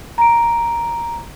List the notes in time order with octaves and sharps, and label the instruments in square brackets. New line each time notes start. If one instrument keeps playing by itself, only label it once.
[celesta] A#5 D7